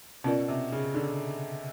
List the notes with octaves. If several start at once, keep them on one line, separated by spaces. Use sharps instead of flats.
B2 C#4 F4 A#4 D5
C3
C#3
D3